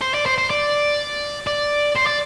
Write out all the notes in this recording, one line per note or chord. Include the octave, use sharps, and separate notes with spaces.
C5
D5
C5
C5
D5
D5
C5
D5